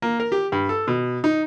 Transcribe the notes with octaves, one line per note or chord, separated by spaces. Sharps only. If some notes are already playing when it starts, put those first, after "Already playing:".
A#3
A#4
G4
G2
A4
B2
D#4